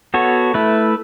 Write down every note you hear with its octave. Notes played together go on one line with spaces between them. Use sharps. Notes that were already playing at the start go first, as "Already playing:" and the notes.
B3 F#4 A4 C#5
A3 E4 B4